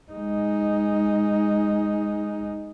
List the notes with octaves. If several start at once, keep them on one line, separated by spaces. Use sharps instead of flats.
G#3 D#4